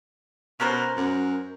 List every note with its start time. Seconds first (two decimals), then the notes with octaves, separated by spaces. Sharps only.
0.60 B2 C#4 A#4 C5
0.96 F#2